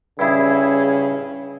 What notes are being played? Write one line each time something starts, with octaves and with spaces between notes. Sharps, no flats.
G2 C#3 E4 G#4